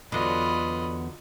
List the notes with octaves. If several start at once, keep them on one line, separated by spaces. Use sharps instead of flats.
E2 D3 F#3 B3 F4 D#5 B5